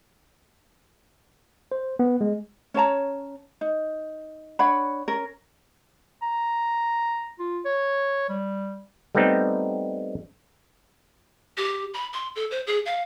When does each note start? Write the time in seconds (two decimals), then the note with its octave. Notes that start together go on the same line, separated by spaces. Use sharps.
1.72 C5
1.99 B3
2.21 G#3
2.74 C#4 C#5 A5 A#5
3.61 D#4
4.59 D4 C#5 F#5 B5
5.08 C#4 A#4
6.22 A#5
7.39 F4
7.66 C#5
8.30 G3
9.15 G3 A3 B3 C4 D#4
11.57 G4
11.94 B5
12.13 C6
12.36 A4
12.51 C5
12.67 G#4
12.86 F5